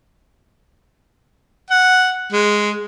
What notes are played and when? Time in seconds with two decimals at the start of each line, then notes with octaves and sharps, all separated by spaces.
1.70 F#5
2.32 G#3